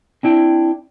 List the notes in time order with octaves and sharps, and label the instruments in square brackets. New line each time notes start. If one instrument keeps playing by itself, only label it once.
[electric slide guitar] C4 D4 E4 G5